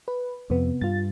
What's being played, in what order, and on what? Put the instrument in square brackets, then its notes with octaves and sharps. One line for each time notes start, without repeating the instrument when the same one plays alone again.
[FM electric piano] B4
[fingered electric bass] F2 [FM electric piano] C3 B3
[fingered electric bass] G2 [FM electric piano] F4 A6